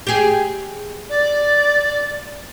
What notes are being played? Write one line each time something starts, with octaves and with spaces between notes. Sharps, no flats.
G4 G#4
D5